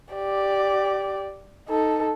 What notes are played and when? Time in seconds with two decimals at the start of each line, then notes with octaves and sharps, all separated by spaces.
0.14 G4 D5
1.68 D#4 A4